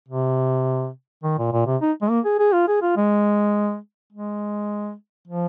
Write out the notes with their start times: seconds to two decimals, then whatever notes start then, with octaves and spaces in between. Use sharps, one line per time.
0.08 C3
1.23 D#3
1.38 A#2
1.52 A#2
1.66 C3
1.82 D#4
2.02 G#3
2.10 A#3
2.25 G#4
2.39 G#4
2.53 F4
2.67 G#4
2.82 F4
2.96 G#3
4.13 G#3
5.27 F3